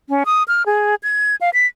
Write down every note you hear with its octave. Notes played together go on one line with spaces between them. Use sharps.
C#4
D#6
F6
G#4
G#6
F5
B6